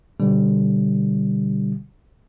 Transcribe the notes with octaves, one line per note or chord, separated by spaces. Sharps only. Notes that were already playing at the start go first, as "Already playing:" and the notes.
B2 D3 G3